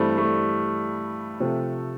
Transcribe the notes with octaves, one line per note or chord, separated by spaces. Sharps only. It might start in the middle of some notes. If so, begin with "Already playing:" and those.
Already playing: G2 E3 G3 A3 C4 G4
A3
C3 F3 A3